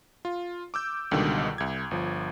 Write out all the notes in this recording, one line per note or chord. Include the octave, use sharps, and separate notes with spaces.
F4
D6 E6 G6
C#2 B2 D3 D#3 G3
C2 G#6
G1 F3